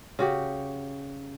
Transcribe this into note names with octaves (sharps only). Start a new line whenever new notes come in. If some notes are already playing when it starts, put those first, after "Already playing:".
C#3 F#4 G4